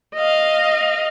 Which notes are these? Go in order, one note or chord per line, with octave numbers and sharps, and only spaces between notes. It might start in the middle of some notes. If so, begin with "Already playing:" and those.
D#5 F5